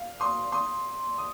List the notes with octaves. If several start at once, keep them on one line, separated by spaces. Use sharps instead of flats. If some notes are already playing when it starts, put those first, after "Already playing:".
Already playing: F5
C6 D#6
C6 D#6
D#6